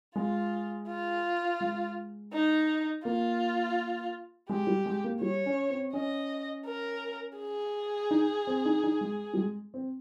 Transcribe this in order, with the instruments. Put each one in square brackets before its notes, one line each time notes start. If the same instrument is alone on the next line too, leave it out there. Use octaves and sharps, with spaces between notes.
[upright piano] G#3 [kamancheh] F4
[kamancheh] F4
[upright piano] G#3
[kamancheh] D#4
[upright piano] A#3 [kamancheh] F4
[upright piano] G#3 [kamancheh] G4
[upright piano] G3
G#3
A#3
[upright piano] G3 [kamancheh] C#5
[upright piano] C#4
C4
[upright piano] C#4 [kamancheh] D#5
[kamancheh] A#4
G#4
[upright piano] D#4
C4
D#4
D#4
G#3
G3
G#3
C4